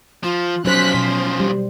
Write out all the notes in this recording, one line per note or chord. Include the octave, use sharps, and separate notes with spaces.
F3 F4
B1 F3 F#3 C#4 C5 F#6 B6
B2 C5
G3